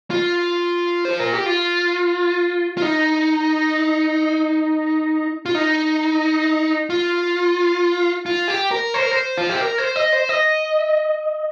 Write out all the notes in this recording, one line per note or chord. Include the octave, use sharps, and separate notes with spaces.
F4
C5
A#4
G4
F4
F4
D#4
F4
D#4
F4
F4
G4
A#4
C5
A#4
C5
F4
G4
A#4
C5
D#5
C5
D#5